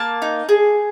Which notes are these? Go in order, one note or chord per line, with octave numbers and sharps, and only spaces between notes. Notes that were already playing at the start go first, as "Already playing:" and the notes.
Already playing: A#3 A5
D#4
G#4